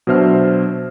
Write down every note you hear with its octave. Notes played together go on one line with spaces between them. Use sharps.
B2 F#3 D4 C5 E5 F6